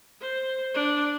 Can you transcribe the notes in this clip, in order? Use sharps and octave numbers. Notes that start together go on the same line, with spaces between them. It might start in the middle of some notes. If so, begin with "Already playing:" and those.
C5
D4